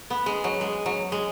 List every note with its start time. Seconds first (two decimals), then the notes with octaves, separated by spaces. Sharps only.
0.10 B3
0.26 G#3
0.44 F#3
0.61 G#3
0.86 F#3
1.12 G#3